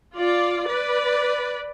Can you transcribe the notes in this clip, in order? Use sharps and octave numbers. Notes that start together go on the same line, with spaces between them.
F4 D5
B4 D5